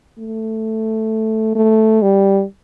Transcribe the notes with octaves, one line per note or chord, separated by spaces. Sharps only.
A3
A3
G3